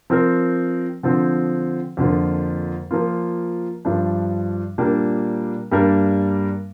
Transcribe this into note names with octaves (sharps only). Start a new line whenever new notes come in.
F3 C4 A#4
D3 F3 C4
F2 D3 F3 A#3 F4
F3 A#3 F4
G2 F3 D4
A#2 G3 A#3 D4
G2 G3 A#3 D4 A#4